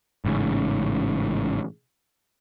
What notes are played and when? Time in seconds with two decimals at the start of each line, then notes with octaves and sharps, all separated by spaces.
0.25 A1 G#2 C#3